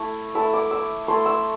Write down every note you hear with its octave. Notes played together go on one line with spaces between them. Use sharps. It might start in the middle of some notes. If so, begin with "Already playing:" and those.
Already playing: A3 E4
A3 E4 E6
D6
E6
A3 E4 C6
E6